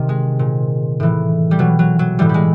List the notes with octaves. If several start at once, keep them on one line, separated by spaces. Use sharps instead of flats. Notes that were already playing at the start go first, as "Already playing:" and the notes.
Already playing: C3 D#3
G#3
A#2
A2 E3
G3
B2 F#3
F#3
F#3
A2 E3 G3
G3
G#3